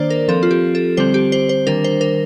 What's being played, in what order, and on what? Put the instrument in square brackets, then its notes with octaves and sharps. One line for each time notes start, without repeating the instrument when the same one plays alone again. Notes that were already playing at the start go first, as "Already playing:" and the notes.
Already playing: [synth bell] D#3 A#3 D4 C5 D5
A#4
F3 C4 A4
F4
G4
A4
D3 G3 C4 C5
G4
C5
C5
D#3 G3 D4 A#4
C5
A#4